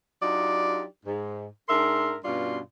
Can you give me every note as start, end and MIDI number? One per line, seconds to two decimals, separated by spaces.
0.22 0.84 54
0.22 0.84 62
0.22 0.84 63
0.22 0.84 65
0.22 0.84 67
0.22 0.84 74
1.06 1.46 44
1.69 2.16 44
1.69 2.16 62
1.69 2.16 70
1.69 2.16 76
1.69 2.16 84
2.25 2.59 43
2.25 2.59 47
2.25 2.59 61
2.25 2.59 65
2.25 2.59 74
2.25 2.59 84